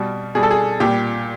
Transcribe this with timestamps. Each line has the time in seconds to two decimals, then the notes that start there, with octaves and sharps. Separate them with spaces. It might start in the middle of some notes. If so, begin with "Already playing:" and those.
Already playing: B2 G3
0.35 B2 G3 G#4
0.43 A4
0.51 G#4
0.80 A#2 G3 G4